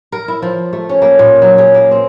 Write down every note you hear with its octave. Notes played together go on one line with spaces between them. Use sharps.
A#4
E4
F3
A3
C#4
A#3
A#2
F#3
G#4
A#3
C4